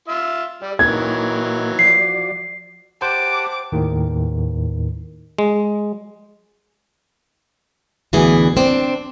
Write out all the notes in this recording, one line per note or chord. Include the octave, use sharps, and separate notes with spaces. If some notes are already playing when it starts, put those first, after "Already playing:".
F4 E5
G3 G4 D5
A#2 D#3 E3 F#3 A#3 D#4 G#6
F3 F#4 D5 C7
G4 C5 F#5 A5 D6
D#2 A2 D#3
G#3
D2 B2 E3 G#4
C4 D4